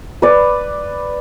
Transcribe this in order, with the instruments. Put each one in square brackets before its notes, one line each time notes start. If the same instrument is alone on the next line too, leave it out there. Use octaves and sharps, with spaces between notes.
[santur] B4 D5